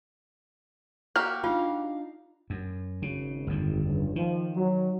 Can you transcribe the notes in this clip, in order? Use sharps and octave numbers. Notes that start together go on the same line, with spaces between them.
A#3 F#4 G4 F6
D4 D#4 F4 F5
F#2
G#1 C#3
G1 F2 D#3
C#2 G2
D#3 F3
F#3